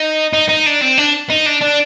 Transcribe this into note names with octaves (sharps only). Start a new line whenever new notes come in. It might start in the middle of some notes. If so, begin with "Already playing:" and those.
Already playing: D#4
D#4
D#4
D4
C4
D4
D#4
D4
D4